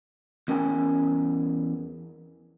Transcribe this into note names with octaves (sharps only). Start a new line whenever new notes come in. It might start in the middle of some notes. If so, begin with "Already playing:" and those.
E2 C#4 A#4 G5 G#5